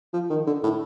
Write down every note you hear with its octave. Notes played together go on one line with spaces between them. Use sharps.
F3
D#3
D3
A2